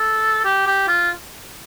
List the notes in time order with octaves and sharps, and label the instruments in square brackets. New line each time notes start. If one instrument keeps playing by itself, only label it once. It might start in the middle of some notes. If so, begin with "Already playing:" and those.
Already playing: [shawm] A4
G4
G4
F4